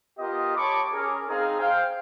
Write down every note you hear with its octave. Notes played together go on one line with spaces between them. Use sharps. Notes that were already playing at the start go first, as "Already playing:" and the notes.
B3 F4 G4 A#4 D#5
C#5 A5 B5 C#6 D6
C#4 G#4 A#4
C4 D#4 G#4 D#5 F5 A#5
C5 F5 G5